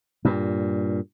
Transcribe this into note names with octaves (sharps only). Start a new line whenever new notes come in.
G2 A#2